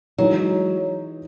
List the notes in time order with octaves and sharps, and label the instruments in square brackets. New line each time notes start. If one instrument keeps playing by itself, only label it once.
[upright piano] E3 G#3 D#4 [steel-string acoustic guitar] F#3